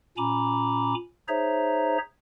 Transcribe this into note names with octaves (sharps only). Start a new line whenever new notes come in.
A#2 C#4 G#5 A#5 B5 D6
D#4 G#4 C5 C#5 E5 A#5